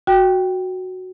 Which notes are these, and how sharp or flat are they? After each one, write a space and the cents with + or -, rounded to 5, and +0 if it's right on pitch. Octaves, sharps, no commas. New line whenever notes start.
F#4 +0 G5 +0